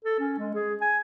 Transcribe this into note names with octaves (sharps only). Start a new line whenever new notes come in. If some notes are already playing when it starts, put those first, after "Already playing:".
A4
C#4
G#3
G#4
G#5